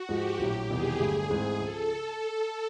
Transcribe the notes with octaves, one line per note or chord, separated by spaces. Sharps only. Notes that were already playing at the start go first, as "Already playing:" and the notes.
Already playing: F#4
G#2 F3 G#3 G4
A#1 A2 F#3
E1 E2 C3 D#3 G3 G#4
G1 G2 D3 F#3 A3 G#4
G#2 E3 A3 C4
C#2 C#3 F3 A4